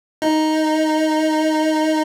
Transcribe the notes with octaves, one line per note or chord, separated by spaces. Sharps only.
D#4